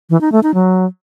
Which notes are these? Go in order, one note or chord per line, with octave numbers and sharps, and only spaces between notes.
E3
D#4
A3
D#4
F#3